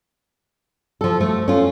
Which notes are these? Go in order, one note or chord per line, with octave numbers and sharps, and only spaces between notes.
F3 A4
A3
C#4 F4